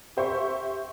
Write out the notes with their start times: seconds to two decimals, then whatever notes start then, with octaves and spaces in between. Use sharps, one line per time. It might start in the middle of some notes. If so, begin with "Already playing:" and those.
0.17 G4 C5 E5 C#6